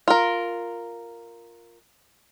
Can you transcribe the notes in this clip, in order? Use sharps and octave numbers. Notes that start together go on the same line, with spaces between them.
F4 A#4